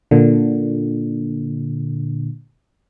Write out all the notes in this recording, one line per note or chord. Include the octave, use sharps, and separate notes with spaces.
A#2 D3